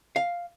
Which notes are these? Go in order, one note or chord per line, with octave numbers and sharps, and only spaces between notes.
F5